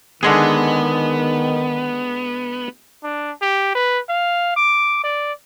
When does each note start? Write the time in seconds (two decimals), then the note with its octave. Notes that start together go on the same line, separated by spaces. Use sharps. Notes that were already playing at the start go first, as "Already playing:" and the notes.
0.23 D3 D#3 G#3 B3 G#4
3.04 D4
3.42 G4
3.75 B4
4.09 F5
4.57 D6
5.04 D5